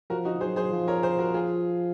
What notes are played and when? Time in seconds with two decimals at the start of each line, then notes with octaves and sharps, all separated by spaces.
0.10 F3 F#4 A#4
0.25 D#4 F#4
0.41 F#3 G#4 C5
0.56 G#4 C5
0.72 F3
0.87 A#4 C#5
1.03 G#4 C5
1.19 F#4 A#4
1.34 F4 G#4